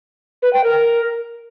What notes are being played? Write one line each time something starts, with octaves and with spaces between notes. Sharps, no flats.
B4
G5
A#4